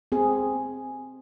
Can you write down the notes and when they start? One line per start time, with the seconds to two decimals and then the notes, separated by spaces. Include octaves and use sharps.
0.12 C4 G#4